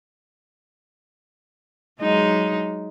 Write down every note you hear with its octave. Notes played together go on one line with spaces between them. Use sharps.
F#3 G#3 D#4